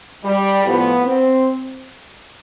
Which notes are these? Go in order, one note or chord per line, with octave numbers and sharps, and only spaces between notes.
G3
A2 F3 B3
C4